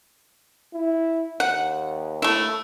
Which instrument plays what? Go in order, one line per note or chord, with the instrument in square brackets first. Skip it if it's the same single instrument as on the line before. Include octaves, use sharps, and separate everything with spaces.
[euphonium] E4
[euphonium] D#2 [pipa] F#5
[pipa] A3 E4